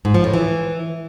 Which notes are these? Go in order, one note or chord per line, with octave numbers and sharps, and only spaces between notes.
G#2
F3
A2
E3